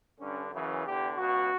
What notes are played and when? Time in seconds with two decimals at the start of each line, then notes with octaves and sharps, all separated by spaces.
0.18 G2 D3 C#4
0.50 F#2 C#3 E3
0.83 E2 D3 G4
1.16 C#2 B2 F#4